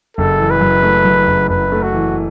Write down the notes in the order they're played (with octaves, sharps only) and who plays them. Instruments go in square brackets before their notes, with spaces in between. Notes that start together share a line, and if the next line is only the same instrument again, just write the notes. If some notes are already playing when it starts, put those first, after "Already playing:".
[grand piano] F#1 [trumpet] A4
[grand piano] E3
[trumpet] B4
[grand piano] F#2
A3
F#2
F#1
[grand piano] F#1 [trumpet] B4
[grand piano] A3
[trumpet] F#4
[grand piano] E3